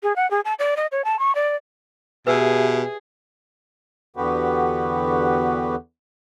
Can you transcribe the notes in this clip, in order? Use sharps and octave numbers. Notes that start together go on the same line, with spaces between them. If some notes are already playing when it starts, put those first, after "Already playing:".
G#4
F#5
G#4
A5
D5
D#5
C#5
A5
C#6
D5
B2 G4 G#4 B4 E5 E6
E2 D3 B3 F#4 G4 B4